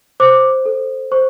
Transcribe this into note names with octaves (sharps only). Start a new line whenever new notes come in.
C5 D6
A4
C5 C#6